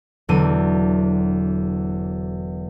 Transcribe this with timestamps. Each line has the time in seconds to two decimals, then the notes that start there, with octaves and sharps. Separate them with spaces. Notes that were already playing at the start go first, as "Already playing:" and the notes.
0.29 E1 E2 D3 F#3 D#7